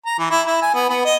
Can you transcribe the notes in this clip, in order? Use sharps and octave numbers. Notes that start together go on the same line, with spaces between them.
A#5
E3
E4
E4
G#5
B3
B3
D#5